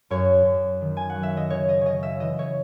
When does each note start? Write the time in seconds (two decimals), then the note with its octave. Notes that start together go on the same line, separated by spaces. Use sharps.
0.10 F#2 C#5
0.45 F#2
0.81 D#3
0.97 G#5
1.10 F#5
1.15 F#3
1.23 E5
1.37 D#5
1.50 C#3 C#5
1.69 D#5
1.81 C#3 C#5 D#5
2.03 E5
2.20 E3 D#5
2.39 C#5